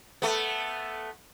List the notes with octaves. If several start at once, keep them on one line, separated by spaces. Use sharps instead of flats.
A3 B3